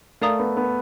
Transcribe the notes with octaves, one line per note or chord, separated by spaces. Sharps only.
A3 A#4 D5 F5 A#5 D#6
B3
B3